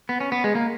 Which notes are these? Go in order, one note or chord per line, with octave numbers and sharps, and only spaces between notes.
B3
C#4
B3
G#3
A#3